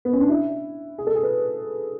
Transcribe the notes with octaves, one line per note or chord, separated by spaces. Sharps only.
B3
C#4
D4
E4
G#4
A4
G#4
B4